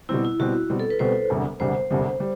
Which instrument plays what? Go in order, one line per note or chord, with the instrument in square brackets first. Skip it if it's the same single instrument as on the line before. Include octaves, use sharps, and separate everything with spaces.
[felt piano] B2 G3 C4 [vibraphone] E4
[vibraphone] E4
[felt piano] B2 G3 C4 [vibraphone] F#4
[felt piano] B2 G3 C4
[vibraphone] A4
B4
[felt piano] B2 G3 C4 [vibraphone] C5
[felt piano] E1 D2 C3 G3
[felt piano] E1 D2 C3 G3 [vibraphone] C5
[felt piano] E1 D2 C3 G3
G3